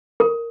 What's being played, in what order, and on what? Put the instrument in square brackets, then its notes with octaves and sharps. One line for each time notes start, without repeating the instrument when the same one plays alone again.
[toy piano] A#4